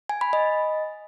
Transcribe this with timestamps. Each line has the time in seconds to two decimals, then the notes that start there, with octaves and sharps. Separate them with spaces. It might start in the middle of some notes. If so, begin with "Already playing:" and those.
0.09 G#5
0.21 B5
0.33 D#5